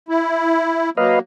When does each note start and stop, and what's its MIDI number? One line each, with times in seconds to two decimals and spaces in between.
0.09 0.90 64
0.97 1.20 54
0.97 1.20 58
0.97 1.19 71
0.97 1.19 75
0.97 1.19 77